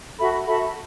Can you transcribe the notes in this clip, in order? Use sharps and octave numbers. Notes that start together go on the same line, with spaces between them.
F#4 A4 E5 B5
F#4 A4 E5 B5